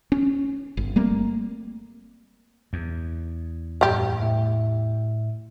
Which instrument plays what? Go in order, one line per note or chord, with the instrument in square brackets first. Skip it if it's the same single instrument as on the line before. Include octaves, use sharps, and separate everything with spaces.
[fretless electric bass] C#4
G1
G3 A3 A#3 C4
[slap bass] E2
[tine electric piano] F#2 A2 [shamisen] G3 G4
[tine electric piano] A2 E5